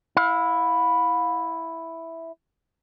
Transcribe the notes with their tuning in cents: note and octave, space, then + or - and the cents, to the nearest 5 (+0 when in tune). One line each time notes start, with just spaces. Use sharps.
E4 +0 F5 +40